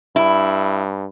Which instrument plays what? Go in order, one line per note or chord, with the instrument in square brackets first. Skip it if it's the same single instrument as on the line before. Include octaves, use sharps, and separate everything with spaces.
[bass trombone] G2 [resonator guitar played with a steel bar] E4